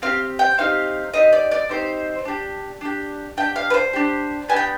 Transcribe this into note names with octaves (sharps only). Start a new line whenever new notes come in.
C4 D#4 G4 F5
G5
C4 D#4 G4 F5
C4 D#4 G4 D#5
D5
D5
C4 D#4 G4 C5
D4 G4
D4 G4
D4 G4 G5
F5
B4
C5
D4 G4
B3 D4 G4 G#5
G5